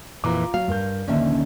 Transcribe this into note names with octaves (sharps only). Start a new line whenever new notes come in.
F2 A#2 E3 F4 A#5 D6
F#3 F5
G2 A#4 G6
A#1 D#2 D3 D#3 C#4 E5